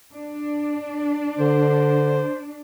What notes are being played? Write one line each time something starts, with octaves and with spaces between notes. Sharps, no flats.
D4
D3 C5